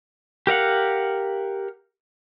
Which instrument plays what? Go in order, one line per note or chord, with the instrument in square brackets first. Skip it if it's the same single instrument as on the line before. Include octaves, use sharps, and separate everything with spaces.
[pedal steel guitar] G4 A#4 F5 F#5